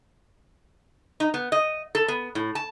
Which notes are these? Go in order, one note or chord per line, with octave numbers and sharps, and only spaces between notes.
D#4
B3
D#5
A4
B3
A2
A5